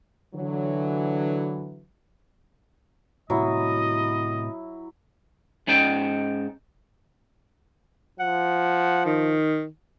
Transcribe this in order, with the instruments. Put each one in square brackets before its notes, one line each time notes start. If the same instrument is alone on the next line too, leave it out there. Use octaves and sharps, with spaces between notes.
[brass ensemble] D3 E3 F#3
[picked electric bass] A2 C3 [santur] F#3 E4 [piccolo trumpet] D#5
[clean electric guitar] G#2 C#4 D#4 G5 A5
[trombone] F3 [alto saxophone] F#5
[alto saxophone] D#3